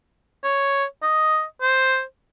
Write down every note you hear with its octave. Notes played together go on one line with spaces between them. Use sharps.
C#5
D#5
C5